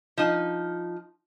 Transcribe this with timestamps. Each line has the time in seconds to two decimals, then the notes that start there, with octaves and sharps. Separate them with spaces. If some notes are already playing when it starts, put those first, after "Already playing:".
0.18 F3 D#4